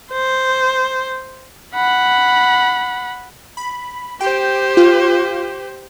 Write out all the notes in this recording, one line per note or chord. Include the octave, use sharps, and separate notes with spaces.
C5
F#5 B5
B5
G4 C5 G5
F4